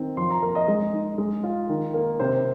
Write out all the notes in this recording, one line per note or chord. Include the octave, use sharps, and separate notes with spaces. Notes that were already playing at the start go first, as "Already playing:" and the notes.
Already playing: D#3 C4
F3 C6
A#5
A#3 A#4
D#5
G#3
D#4
G#3
F4
D#3
A#3
C3 C5